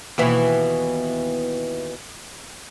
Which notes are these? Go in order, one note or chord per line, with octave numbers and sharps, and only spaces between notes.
D#2 B2 E3